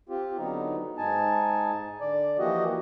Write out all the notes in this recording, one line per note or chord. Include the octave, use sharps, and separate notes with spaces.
C4 F4 G4
D3 F#3 B3 D#4
G#2 D#4 G#5 A5
D3 D5
E3 F3 A#3 F#4 G4 D#5